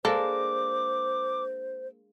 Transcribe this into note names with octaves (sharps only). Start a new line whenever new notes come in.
G#3 A#3 D4 A4 C5 D6